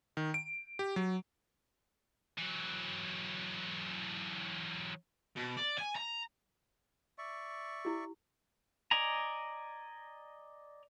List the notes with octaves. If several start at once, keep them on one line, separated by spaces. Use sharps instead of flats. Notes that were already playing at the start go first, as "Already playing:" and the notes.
D#3
D7
G4
F#3
E3 F#3
B2
D5
G#5
A#5
D5 E5 C#6
E4 G4
D5 D#5 G#5 A#5